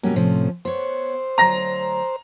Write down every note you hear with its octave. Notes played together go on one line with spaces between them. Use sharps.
B2 F#3 G3 A#3 C#4
A2 C3 F3 C#4
B3 C5 C#5
D2 F#3 A#5 A#6